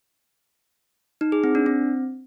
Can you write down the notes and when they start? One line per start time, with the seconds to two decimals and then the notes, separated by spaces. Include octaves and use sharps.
1.21 D#4
1.32 G#4
1.44 C4
1.55 D4
1.66 C4